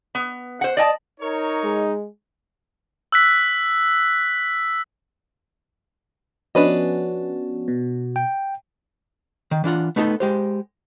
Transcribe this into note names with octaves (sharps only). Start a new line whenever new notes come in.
B3
C5 F#5
D5 D#5 G#5 A5
D#4 A#4 C#5
G#3
E6 F#6 B6
F3 B3 C#4 D4 F#4 B4 D#5
B2
G5
D#3
E3 D4 F4 F#5
A3 B3 D#4 G4 A4
G#3 G4 C5